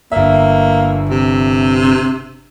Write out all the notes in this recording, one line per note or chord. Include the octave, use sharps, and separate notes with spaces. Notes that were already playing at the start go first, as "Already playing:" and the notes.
G1 A#3 E5
C3